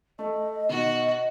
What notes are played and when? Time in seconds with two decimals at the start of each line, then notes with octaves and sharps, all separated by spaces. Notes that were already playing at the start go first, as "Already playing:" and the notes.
0.19 A3 D#5
0.69 B2 D#3 F#4 F#6